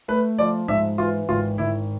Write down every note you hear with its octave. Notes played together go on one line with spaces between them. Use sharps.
A3 B4
F3 D5
G#2 E5
E3 F4
G#1 F4
G#1 E4